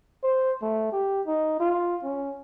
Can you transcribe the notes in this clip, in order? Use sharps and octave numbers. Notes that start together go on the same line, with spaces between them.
C5
A3
G4
D#4
F4
C#4